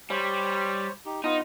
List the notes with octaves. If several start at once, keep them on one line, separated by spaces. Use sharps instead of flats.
G3 C5 C#5
D#4 G4
B3 D#4 F4